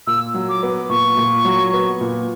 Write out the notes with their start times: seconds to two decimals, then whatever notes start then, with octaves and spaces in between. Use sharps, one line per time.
0.07 A#2 E6
0.34 F#3
0.49 D6
0.63 B3
0.89 A#2 C#6
1.17 A#2
1.45 F#3
1.73 B3
2.01 A#2